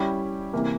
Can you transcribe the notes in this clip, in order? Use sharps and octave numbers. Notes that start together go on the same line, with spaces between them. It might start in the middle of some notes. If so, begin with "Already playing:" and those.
Already playing: G3 C#4 E4 G4
C3 E3 A#3